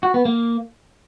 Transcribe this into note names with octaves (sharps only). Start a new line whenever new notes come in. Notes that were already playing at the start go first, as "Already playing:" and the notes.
F#4
B3
A#3